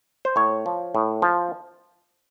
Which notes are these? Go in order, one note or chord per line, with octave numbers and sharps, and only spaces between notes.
C5
A2 C#5
F3
A2
F3